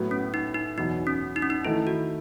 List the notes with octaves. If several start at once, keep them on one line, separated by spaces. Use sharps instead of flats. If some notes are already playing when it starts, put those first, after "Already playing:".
Already playing: A2 F#3 B3 F#4
C#4
D#4
D#4
E2 B2 F#3 D#4
C#4
D#4
C#4
D#4
D#3 A3 D#4 E4
F#4